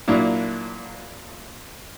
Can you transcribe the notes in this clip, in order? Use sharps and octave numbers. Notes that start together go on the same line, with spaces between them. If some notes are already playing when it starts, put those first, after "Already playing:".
A#2 F#3 A#3 D4 E4